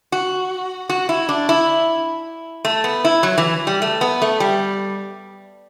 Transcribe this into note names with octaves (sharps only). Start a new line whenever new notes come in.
F#4
F#4
E4
D4
E4
A3
B3
E4
F#3
E3
G3
A3
B3
A3
G3